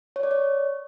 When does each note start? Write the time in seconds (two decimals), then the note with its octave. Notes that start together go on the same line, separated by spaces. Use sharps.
0.16 C#5
0.23 D5
0.31 C#5